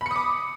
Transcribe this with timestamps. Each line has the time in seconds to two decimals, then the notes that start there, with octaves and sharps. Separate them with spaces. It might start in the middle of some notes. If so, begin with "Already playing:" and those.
0.01 B5
0.06 C#7
0.11 D#6
0.16 D6